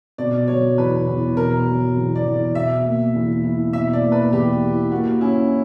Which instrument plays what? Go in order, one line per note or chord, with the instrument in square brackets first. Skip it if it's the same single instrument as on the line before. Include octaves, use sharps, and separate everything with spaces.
[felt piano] B2 [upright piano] D5
[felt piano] F#3 [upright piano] C#5
[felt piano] E2 [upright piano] B4
[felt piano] E2
[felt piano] B2 [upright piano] A#4
[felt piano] F#3
E2
[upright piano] D5
[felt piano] E2
[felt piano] B2 [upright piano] E5
[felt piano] A#3
E2
E4
[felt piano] B2 [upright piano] E5
[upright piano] D5
[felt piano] A#3
[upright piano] B4
[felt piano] E2 [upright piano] G4
[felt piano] E4
[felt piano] A#3 [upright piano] F#4
[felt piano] C#4 [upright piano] E4